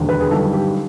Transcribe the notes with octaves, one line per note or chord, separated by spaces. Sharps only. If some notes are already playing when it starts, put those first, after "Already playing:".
Already playing: E1 D#2 D3
B4
G#4
G1 F#2 D#3 G3 A4
G4